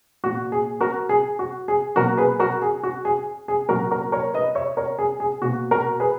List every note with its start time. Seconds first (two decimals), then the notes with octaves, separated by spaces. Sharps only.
0.23 A#2 A#3 F#4
0.52 G#4
0.81 F#4 A#4
1.09 G#4
1.39 F#4
1.68 G#4
1.96 B2 F#3 A#3 F#4 A#4
2.17 G#4 B4
2.39 F#4 A#4
2.62 G#4
2.83 F#4
3.05 G#4
3.48 G#4
3.69 A#2 F#3 A#3 F#4 A#4
3.91 F#4 A#4
4.12 A#4 C#5
4.34 B4 D#5
4.55 C#5 E5
4.77 A#4 C#5
4.99 G#4
5.20 G#4
5.42 B2 A#3 F#4
5.71 F#4 A#4
6.00 G#4 B4